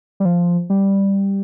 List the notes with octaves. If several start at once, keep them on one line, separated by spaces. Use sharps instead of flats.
G3
F3
G3